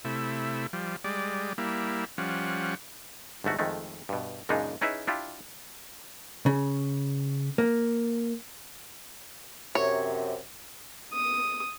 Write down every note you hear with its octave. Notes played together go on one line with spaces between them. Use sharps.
C3 A3 E4
F3 G3
G3 G#3 D5
G3 A#3 E4
F3 G3 C#4 F#5
G1 G#2 A3 F#4
F2 D#3 G#3 A3
G2 B2
F#2 A#2 C#3 G#3 D4 D#4
C#4 D#4 E4 G#4 B4 E5
D4 E4 F4 G4
C#3
A#3
F#2 C3 C#5
D#6